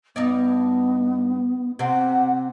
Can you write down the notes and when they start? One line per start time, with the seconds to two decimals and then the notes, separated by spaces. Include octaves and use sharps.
0.16 G2 B3 D#4 D5
1.79 C3 C4 F#5